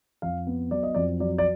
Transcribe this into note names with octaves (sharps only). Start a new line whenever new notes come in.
F2 F5
B3
F#3 D5
D#5
F2 D5
F#3 D5
D5